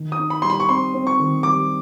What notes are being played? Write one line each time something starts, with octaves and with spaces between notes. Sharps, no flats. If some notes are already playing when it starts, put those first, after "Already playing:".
Already playing: D#3
D#6
D#4
B5
G3 C6
B5
C#6
C4 C6
C4
C#6
D#3
G3 D6